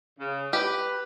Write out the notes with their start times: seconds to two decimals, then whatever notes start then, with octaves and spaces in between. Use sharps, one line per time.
0.18 C#3
0.53 G4 B4